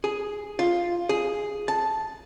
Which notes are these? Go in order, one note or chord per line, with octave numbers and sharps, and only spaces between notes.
G#4
F4
G#4
A5